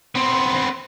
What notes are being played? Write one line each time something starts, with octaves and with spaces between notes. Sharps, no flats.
B3 C4